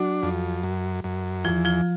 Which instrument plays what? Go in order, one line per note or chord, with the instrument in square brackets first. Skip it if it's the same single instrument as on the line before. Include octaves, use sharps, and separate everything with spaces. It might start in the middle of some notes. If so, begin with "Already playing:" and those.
Already playing: [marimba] F#3 F#4 [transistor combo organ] D4
[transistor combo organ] F2
F#2
F#2
[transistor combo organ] E2 [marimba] F3 F4
[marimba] F3 F4